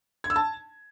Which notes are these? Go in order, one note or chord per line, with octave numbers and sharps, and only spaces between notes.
G#6
E6
A5